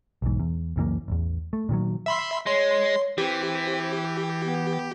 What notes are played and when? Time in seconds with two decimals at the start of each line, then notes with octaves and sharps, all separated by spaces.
0.22 B1 E2 G#2
0.40 E2
0.76 C#2 F#2 E3 A#3
1.08 A1 E2
1.53 A3
1.69 A#2 D#3 F3 F#3
2.06 E5 B5 C6
2.46 G#3 C#5 C6
3.18 E3 C4 G4
4.44 B3